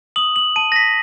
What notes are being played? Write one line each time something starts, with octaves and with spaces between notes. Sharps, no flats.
D#6 F#7
F#7
A5 D#7
A#6
B6